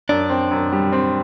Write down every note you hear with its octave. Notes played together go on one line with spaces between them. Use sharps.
F#2 D4
C4
F#2
G3
C4